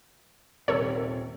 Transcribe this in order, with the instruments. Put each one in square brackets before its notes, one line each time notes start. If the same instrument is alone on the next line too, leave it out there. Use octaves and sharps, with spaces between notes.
[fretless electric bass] D#1 C3 [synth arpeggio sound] A4 A#4 C#5